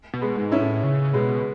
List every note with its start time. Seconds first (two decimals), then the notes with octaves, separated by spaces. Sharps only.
0.14 B2
0.21 G#3 B3
0.37 G#2
0.52 C#4 E4
0.60 A2
0.83 C#3
1.13 B2 G#3 B3